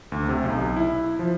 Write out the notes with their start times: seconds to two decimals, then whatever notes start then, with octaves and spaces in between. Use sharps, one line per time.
0.12 D2
0.29 C3
0.44 B1
0.76 E4
1.19 F3